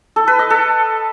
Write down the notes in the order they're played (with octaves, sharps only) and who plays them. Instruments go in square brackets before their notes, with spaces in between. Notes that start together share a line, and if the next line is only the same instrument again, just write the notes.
[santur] A4
B4
D#5
A4